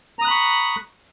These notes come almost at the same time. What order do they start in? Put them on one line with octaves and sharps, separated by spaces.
A#5 D#6 F#6 B5 C#6